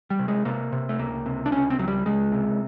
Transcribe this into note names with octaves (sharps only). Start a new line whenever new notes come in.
G3
C3
G#3
C3 A#3
C3
A3
C#2 A#3
C3
D4
C#2 C#4
C4
C#2 F#3
G3
C#2 G#3
C3